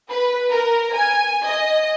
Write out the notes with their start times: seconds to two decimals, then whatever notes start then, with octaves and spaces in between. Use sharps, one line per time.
0.10 B4
0.50 A#4
0.95 G#5
1.46 D#5